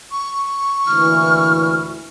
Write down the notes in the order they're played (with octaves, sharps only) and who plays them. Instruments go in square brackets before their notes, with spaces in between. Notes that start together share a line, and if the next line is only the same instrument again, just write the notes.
[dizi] C#6
[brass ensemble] D2 A#2 E3 [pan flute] F6